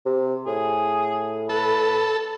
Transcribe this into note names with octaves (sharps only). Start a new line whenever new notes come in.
C3
A2 G#4
A4 B4